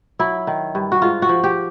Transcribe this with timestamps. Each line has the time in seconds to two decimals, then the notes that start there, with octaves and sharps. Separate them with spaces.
0.19 F#3 E4
0.47 D#3
0.75 G2
0.92 F#4
1.02 G#2 F4
1.22 F#4
1.29 F3
1.44 G4